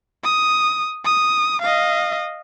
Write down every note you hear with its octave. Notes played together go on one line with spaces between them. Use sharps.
D#6
D#6
D#5 F5